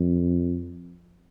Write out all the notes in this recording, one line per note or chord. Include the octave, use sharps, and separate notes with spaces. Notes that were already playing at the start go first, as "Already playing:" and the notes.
Already playing: F2